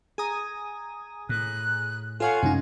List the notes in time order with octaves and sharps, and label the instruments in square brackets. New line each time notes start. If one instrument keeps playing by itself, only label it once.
[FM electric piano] G#4 A#5 [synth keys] G#5 D#6
[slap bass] A2 [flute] F#6
[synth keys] F4 F5 F#5 [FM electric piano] A4 C#5 C#6 [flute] G#5
[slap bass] F#2 C3 G#3 [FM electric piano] C#4 D#4